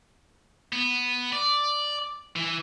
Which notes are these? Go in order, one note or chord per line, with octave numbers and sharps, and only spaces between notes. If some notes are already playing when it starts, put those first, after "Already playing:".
B3
D5
E3